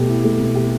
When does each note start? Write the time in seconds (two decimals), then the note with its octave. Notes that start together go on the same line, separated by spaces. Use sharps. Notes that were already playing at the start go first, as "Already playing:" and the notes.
Already playing: B2 A3 G4
0.09 E4
0.24 A3
0.40 B2
0.55 G4